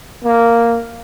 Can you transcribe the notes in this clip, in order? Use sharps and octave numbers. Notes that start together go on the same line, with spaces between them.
A#3